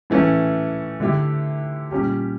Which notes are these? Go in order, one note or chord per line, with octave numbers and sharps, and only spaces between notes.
A2 E3 A3 C#4
D3 A3 E4 G4
A#2 G3 C#4 G4